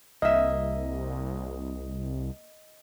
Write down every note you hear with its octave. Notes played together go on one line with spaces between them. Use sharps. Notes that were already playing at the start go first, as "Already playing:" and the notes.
C2 A#3 D#5 E5